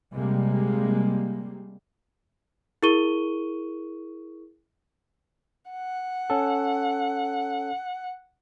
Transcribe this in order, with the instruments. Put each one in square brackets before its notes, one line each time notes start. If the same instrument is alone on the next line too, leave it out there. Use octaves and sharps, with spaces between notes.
[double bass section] C3 G3 G#3 A#3
[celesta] E4 G#4 A#4 C#6 D#7 G7
[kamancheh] F#5
[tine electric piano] C#4 A4